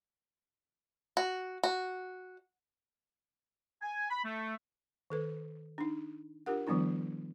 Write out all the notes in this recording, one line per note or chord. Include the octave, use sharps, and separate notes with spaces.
F#4
F#4
G#5
B5
A3
D#3 A4 B4
D4 D#4
D4 F4 G4 A#4 F#5
D#3 F3 G3 B3 D4 E4